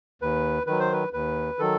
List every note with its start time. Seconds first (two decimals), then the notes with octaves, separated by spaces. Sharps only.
0.22 D#2 B4
0.67 D#3 F#3 B4
0.80 C5
0.93 B4
1.13 D#2 B4
1.59 D#3 F#3 A4